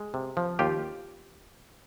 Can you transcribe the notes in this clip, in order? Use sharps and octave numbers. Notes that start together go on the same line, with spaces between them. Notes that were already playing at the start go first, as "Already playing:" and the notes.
Already playing: G#3
C3
F3
D#2 F4 G4